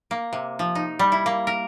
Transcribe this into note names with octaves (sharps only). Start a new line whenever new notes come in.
A#3
C3
F3
D#4
G3
E4
A#3
A#4